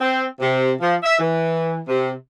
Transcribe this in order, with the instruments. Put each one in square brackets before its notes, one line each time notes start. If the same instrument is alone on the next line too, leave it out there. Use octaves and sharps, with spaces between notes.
[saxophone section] C4
C3
F3
E5
E3
C3